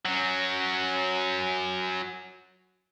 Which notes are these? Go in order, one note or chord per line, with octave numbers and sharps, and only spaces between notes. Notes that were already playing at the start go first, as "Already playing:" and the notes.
F#3 C#4